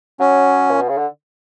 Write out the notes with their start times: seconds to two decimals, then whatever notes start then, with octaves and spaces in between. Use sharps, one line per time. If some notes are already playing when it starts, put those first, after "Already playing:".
0.20 F#3 C#4
0.71 A#2
0.80 B2
0.89 C#3
0.97 D3